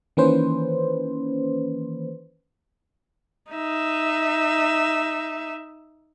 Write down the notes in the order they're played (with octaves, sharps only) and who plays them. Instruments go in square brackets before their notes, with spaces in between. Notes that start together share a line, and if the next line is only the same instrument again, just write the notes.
[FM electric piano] D#3 E3 A#3 C#4 B4 C5
[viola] D#4 E5